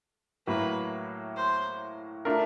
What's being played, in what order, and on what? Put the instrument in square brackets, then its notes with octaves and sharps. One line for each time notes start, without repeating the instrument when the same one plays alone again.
[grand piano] A2 F#3 A#3 [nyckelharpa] B4
[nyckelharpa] C5
[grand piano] A3 D4 F4 A#4